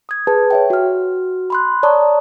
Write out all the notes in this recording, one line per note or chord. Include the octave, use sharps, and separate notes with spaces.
D#6 G#6
G#4 B4 A5
C#5 E5 G5
F#4 F6
B5 C6 F#6
C#5 D5 A5 A#5 C#6 D#6